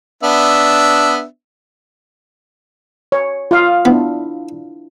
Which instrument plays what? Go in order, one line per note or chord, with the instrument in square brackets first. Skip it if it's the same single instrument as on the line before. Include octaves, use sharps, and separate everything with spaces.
[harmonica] B3 D4 E5
[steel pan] C#5
F4 F5 D#6
[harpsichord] B3 [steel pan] D4 E4